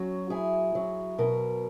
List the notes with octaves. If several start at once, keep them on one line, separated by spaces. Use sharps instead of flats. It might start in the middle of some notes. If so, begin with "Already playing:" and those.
Already playing: F#3 C#4 F#4
E4 G#4
F#3
B2 A#4